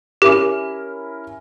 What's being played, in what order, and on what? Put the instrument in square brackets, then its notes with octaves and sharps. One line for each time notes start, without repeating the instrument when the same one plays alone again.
[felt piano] C#4 E4 A#4 [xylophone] G4